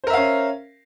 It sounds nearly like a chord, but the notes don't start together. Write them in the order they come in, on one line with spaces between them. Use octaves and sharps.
C5 A#4 E5 F5 C#4